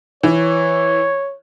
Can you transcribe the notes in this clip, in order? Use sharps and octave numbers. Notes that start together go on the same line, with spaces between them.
E3 C#5